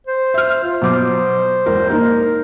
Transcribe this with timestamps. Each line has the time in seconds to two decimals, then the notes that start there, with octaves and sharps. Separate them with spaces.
0.07 C5
0.34 E5 F6
0.63 F4
0.82 B2 F#3 C5 D6
1.66 E1 A#4
1.90 A#3 D#4 A#4